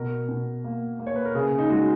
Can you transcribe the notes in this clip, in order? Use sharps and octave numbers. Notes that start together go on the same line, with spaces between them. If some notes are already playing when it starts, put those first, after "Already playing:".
Already playing: B2 A#4
B2
A#3
A#3
C#5
B4
A#4
C#3 G#4
D#4
G#3 F#4